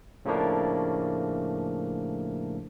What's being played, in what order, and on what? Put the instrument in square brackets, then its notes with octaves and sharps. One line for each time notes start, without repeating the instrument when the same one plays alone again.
[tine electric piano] A2 C#3 F3 A3 A#3 D4